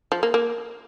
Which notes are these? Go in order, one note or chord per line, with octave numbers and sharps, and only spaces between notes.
F3
A#3
A#3